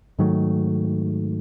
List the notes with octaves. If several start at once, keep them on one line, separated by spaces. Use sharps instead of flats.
G#2 D#3 F#3 A3